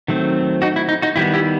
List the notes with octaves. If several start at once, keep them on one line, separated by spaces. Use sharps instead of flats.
D#3 F#3 A3 C4
D#4 F#4
E4
D#4
D#4 F#4
D#3 G3 B3 E4 G4
E4 G4